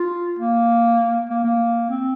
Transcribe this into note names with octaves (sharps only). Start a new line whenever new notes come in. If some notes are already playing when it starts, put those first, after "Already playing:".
Already playing: F4
A#3
A#3
A#3
C4